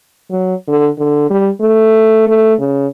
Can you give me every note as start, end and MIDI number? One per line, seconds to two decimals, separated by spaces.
0.31 0.55 54
0.68 0.89 50
0.99 1.29 50
1.30 1.49 55
1.61 2.25 57
2.27 2.54 57
2.59 2.87 49